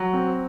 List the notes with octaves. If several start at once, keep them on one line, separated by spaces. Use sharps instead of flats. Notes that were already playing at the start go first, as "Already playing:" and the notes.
Already playing: F#3
C4